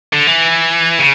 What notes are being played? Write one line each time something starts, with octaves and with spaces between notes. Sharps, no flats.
D3
E3
C#3